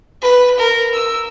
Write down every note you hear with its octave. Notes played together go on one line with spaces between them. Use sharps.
B4
A#4
E6